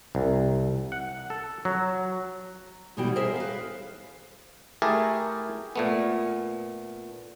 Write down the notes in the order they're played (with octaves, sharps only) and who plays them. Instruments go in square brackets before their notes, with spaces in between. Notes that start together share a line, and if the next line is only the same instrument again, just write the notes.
[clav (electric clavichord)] C2
F#5
A4
F#3
[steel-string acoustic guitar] D2 B2 E3 G3 E4 G5
G#4 A#4 C5 D#5 E5
B4 F5
[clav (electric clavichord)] A3 E4 G4 G#4 A#4 A5
A#2 A3 B3